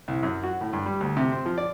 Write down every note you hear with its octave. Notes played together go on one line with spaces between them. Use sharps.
C2
F#2
F#4
A2
G2
G3
D2
C3
C4
F3
D5